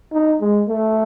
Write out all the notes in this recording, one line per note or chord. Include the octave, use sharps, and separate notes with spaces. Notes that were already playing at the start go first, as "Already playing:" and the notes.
D#4
G#3
A3